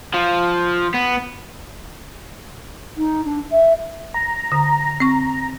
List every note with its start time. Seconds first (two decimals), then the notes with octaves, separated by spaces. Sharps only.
0.14 F3
0.94 B3
2.97 D#4
3.25 D4
3.51 E5
4.14 A#5
4.52 D3
5.00 C4 C#6